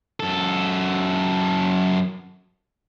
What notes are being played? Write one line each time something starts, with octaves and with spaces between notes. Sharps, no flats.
F#2 A4